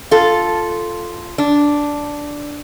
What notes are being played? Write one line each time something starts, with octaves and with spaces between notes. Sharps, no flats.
F4 A4
D4